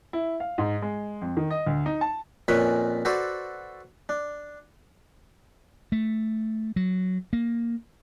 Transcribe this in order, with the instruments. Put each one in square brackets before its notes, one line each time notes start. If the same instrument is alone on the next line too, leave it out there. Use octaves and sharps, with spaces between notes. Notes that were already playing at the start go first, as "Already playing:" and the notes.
[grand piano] E4
F5
G#2
G#3
F2
D#3
D#5
D2
D#4
A5
[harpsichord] F2 A#2 C#4 B4 G#5 B5
F#4 A4 B4 C5 D5
D4
[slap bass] A3
F#3
A#3